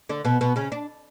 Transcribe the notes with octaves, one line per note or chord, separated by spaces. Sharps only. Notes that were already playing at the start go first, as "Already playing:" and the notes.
D3 D4
B2 B3
B2 B3
C#3 C#4
D4